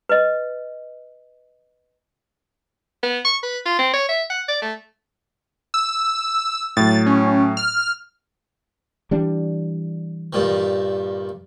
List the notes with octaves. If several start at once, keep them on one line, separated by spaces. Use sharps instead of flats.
B4 D#5
B3
C#6
B4
F4
C4
C#5
E5
F#5
D5
A3
E6
A2 F#3 A6
C#4
F6
E3 G3 D4
G2 A#2 D#3